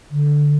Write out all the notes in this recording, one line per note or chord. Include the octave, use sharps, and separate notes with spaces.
D3